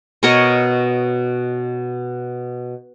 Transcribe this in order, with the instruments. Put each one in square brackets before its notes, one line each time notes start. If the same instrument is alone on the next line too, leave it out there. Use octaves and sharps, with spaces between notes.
[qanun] B2 A#4 C#5 D#5